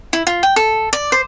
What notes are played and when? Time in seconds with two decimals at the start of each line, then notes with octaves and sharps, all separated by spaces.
0.13 E4
0.27 F4
0.43 G5
0.56 A4
0.93 D5
1.12 C5